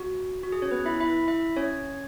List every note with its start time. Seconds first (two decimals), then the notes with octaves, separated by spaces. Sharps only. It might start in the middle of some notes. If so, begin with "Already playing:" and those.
Already playing: F#4
0.43 F#4
0.52 G#4
0.62 C#4 C#5
0.71 B3 B4
0.86 E4 E5
1.00 E4 E5
1.28 E4 E5
1.57 C#4 C#5